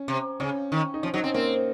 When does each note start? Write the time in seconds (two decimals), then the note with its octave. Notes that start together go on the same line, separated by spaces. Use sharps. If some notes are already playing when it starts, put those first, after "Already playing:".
Already playing: C#4
0.08 C3
0.40 C#3 C#4
0.72 D#3
0.94 D#4
1.03 F3 C#4
1.14 F#3 D#4
1.24 C4 C#4
1.34 A#3 C4